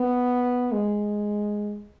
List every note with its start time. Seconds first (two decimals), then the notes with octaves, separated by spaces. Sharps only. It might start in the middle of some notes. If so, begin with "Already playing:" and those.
Already playing: B3
0.72 G#3